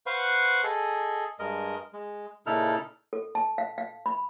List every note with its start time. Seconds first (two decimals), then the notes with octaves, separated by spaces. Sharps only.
0.06 B4 C5 F5 F#5 C#6
0.64 G#4 A4 D#5
1.39 G2 G#3 A#4 D#5
1.93 G#3
2.46 A#2 C#3 D#4 E4 A4 F6
3.13 A4
3.35 A5
3.58 F5
3.78 F5
4.06 B5